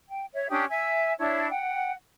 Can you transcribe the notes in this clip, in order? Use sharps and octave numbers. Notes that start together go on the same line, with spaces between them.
G5
C#5 E5
C#4 D4 G4 D#6
E5 G#5 E6
D4 E4 C#5 A5
F#5 G5